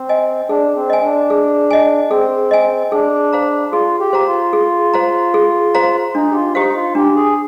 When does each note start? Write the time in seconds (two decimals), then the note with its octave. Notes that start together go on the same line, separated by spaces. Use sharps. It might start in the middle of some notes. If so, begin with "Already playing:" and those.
Already playing: C4
0.09 D#5 G#5
0.49 D4 G#4
0.76 C4
0.90 D#5 G#5
1.03 D4
1.30 G#4
1.71 D#5 G#5
2.10 C4 G#4
2.51 D#5 G#5
2.92 D4 G#4
3.33 C5 F5 A#5
3.72 F4 G#4
4.00 G4
4.13 C5 F5 A#5
4.27 F4
4.53 G#4
4.94 C5 F5 A#5
5.34 G#4
5.75 C5 F5 A#5
6.15 D4 D#4
6.31 G4
6.35 F4
6.55 D#4 G4 C5 F5
6.75 F4
6.95 D4 G4
7.16 G#4